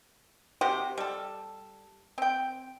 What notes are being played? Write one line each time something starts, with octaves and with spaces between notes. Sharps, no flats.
C3 F#4 G4 C5
G3 A4
C4 G5